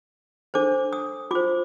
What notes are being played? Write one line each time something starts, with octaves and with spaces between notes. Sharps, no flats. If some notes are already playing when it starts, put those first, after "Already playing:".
D4 A4 C5 D6
D#6
F4 C5 D6